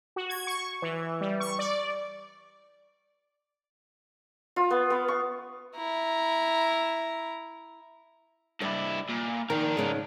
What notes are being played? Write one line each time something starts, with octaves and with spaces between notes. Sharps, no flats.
F#4
G#6
C#6
E3
G3
C#6
D5
F4
B3
B3
C#6
E4 A#5
G2 E4 D5
A#2
D#3 D4 A#4
G#2 C#3 G#3